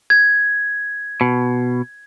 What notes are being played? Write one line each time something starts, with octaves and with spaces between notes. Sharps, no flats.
G#6
B2